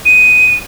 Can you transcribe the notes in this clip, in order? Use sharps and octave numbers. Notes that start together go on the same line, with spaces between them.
D#7